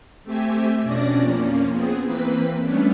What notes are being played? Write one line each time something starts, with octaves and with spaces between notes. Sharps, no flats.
A3 C4 G4 E5 G#5
F2 B2 C#4 D4 D5 A#6
F2 F3 A#3 C#4
B3 C4 G#4
E3 A#3 C4 B4 B6
G3 A3 B3 C#4 D4